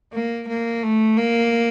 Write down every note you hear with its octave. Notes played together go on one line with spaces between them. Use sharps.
A#3
A#3
A3
A#3